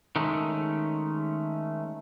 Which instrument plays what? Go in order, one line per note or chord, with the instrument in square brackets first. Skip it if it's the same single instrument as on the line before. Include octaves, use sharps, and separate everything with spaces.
[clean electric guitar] D#3 G#3 A3 C#4